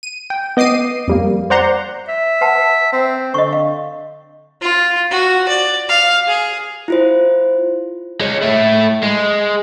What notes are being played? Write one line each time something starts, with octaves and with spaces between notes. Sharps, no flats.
D#7
G5
B3 D#5 D6 C7 D#7
F2 G3 A#3
C5 D5 F#5 A#5 C6
E5
B4 F#5 A5
C4
D3 D#5 C#6
F5
F4
F#4
D5
F5
G#4
E4 F4 C5
G#3 C#4
A3 E4
G#3